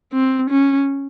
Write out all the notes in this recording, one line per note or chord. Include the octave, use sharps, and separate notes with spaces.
C4
C#4